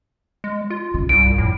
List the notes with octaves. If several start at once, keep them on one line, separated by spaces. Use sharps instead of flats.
G#3
F4
C#3
C2 G2 D7
F2 A2